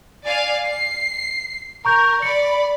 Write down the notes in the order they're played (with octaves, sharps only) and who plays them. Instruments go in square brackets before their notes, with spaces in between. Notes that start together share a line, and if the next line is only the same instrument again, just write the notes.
[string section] D5 F5 G#5
C7
[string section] A#4 [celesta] A#5 C#6 G6
[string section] D5 B5 [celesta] C#7